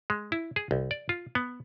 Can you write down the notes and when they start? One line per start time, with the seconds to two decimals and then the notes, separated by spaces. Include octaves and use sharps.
0.10 G#3
0.32 E4
0.56 G#4
0.71 C2
0.91 D5
1.09 F4
1.35 B3